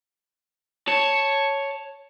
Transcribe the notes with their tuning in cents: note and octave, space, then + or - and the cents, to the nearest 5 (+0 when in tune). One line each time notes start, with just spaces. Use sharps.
C#5 +0 A5 +0